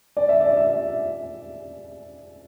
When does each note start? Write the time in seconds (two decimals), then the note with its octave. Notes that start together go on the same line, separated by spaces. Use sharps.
0.17 D5
0.29 E5
0.41 D5
0.57 E5